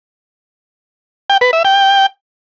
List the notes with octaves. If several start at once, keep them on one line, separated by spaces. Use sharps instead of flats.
G5
B4
E5
G5